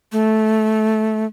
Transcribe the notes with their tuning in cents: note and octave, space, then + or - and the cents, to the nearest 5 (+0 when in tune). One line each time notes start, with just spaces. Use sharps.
A3 -15